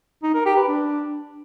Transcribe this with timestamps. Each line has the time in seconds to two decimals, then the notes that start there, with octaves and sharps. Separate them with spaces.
0.23 D#4
0.34 A#4
0.46 G4
0.57 B4
0.68 D4